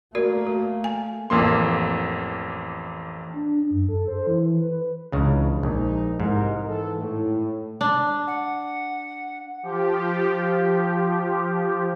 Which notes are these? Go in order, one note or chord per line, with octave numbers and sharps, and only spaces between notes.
A3 A#3 F#4 A#4 D5
F#4
G#5
A1 F2 A#3 C6
D4
F#2
A4
C5
E3
B4
C#2 C#3 E3 F3 D4
A#1 G#3 D#4
C2 G#2 A#4 D#5
E3 A4
A2
D4
F#5
F3 G4